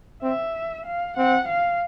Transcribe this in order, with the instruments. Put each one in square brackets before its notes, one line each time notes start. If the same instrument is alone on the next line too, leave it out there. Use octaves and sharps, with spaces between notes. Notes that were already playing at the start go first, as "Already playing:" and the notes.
[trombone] C4 [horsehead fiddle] E5
[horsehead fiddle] F5
[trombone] C4 [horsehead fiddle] F#5
[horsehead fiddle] F5